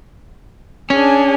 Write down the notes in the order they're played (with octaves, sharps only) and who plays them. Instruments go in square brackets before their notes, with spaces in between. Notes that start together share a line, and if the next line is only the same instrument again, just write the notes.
[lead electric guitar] C#4 [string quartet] D4 G#4